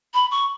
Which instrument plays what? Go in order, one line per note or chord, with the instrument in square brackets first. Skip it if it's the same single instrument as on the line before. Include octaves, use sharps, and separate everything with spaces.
[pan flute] B5
C#6